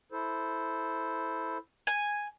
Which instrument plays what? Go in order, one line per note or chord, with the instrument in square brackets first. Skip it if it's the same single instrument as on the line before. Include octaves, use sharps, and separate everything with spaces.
[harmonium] E4 A4 C5
[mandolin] G#5